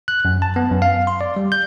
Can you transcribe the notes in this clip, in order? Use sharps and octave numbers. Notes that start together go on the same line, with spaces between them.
F#6
F#2
A5
B3
F#2
F5
C6
D5
G3
G6